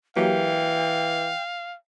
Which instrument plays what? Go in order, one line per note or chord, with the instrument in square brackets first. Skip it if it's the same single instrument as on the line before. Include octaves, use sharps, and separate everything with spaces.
[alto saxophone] E3 [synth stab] F#3 A#3 G4 [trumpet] F5 [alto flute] G5